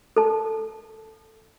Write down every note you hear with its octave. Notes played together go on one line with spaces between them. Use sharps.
A4 A5